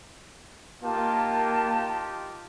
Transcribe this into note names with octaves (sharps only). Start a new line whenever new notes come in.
A#3 D#4 F4 G4 A5